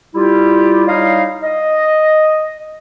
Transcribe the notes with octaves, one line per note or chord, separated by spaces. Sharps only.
G3 E4 F4 G4
G3 D#4 E4 C#5 D#5 F5
D#5